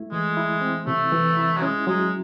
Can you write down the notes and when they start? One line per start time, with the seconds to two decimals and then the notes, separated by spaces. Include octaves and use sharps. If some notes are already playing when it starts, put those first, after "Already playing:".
Already playing: A3 E4
0.12 E3 G#3
0.37 E4
0.61 C4
0.87 C3 A3
1.12 E3
1.37 E4
1.57 F#3
1.62 G#3 C#4
1.87 F#3 G#3